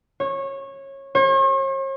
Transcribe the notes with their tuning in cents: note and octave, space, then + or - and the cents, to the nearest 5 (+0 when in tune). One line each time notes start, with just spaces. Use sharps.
C#5 -20
C#5 -45